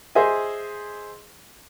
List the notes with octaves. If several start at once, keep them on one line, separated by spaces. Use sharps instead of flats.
G#4 C5 D#5 E5 G#5